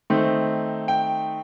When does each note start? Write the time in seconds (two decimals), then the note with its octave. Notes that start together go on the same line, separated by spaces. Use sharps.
0.10 D#3 A3 C4 D#4
0.88 G5